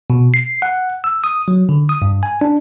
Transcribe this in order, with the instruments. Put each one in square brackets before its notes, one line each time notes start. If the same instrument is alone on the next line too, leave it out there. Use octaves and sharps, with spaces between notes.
[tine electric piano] B2
C7
F#5
E6
D#6
F#3
D3
D#6
G2
G#5
D4